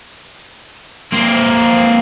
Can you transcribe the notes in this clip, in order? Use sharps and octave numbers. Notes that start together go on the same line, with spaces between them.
A#3 C4